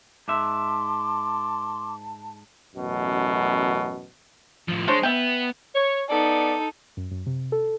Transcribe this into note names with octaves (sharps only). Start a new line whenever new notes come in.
G#2 E5 A5 C6 D6
A1 F#2 B2
A2 F3
G#3 D4 C5 C#5
B3 E5 G5
C#5
B3 D#4 A4 D5
F#2
F#2
C3
A4